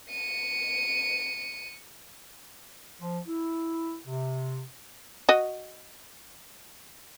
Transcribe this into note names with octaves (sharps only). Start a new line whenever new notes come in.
C#7 D#7
F3
E4
C3
F#4 D#5